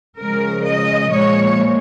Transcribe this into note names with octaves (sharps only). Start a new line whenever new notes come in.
C#3 F3 G#3 A#4
D#5
A#2 F3 G#3 C#5